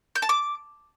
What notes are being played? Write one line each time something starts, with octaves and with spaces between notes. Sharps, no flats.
G6
A5
D6